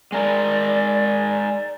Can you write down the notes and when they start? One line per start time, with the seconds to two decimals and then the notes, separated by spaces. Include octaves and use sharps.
0.12 G#3 A#4 D5